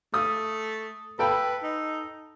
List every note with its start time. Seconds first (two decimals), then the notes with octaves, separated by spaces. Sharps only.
0.14 A3 D#6
1.19 A4 B4 G5 B5
1.63 D#4